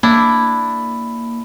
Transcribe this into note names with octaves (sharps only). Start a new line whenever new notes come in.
A#3 D4 E4